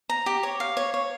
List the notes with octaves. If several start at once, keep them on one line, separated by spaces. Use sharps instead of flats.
A#5
G4
C#5
F5
C#5
C#5